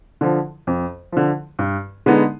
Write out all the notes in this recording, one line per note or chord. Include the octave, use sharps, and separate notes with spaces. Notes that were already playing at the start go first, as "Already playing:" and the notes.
D3 F3
F2
D3 F3
G2
D3 G#3 B3 D#4